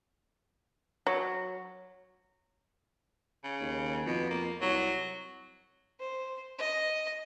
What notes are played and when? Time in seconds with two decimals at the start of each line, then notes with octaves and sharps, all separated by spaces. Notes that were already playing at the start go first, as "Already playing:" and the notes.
1.07 F#3
3.44 C#3
3.60 D#2
4.06 F2 B2
4.30 A#3
4.61 C2 F#3
5.99 C5
6.58 D#5